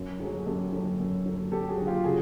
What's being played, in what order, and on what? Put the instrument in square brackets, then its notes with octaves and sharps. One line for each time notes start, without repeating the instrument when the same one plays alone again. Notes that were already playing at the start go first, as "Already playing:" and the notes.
Already playing: [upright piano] F#2
[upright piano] D3 F#3 [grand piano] F#4 G#4
[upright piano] F#2 [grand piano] G4 A4
[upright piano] D3 F#3
F#2
D3 F#3
[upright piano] F#2 [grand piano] G4 A4
[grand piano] F#4 G#4
[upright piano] D3 F#3
[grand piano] F4 G4
[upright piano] C#3 [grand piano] F#4 G#4